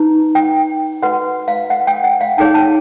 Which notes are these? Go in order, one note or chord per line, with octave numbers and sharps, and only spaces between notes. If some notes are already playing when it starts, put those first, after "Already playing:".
Already playing: D#4 B4 A#5
G5
F#4 B4 F#5
F5
F#5
G5
F#5
F5
D#4 G#4 C#5 G5
A5